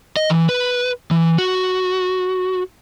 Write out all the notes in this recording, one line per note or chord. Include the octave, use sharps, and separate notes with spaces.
D#5
E3
B4
E3
F#4